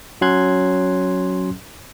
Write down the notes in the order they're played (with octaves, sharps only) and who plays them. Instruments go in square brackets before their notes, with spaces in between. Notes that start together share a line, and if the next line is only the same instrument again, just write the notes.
[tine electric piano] F#3 C#4 C6 F#6 G#6